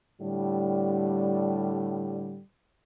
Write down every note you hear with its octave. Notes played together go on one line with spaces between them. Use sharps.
A2 D3 G3